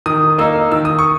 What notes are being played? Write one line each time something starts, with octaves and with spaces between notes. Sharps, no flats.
D#3 D#6
A#3 D#4 E6
D#3 E6
D#6
C#6